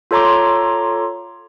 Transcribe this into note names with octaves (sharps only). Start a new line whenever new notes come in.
F4 A4 C#5 A#5 C6 D6